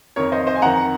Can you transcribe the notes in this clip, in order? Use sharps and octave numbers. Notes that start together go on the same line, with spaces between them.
F2 D#3 A#4 C#5
C5 D#5
C5 D#5
G#5
F2 D#3 F#5 A#5